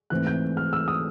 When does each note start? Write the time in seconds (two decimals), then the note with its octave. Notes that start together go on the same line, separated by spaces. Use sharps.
0.10 G#2 E3 A3 C4 F#6
0.27 G6
0.57 F6
0.73 E6
0.88 D#6